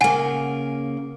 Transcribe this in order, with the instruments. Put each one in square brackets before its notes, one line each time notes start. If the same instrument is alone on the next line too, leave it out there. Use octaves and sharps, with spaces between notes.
[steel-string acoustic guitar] C#3 A#3 [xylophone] F#5 G#5